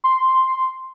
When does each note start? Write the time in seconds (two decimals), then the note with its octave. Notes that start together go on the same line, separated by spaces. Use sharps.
0.04 C6